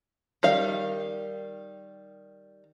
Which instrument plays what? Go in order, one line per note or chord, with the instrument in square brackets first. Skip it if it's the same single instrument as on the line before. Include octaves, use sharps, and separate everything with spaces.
[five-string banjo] D#3 G3 F5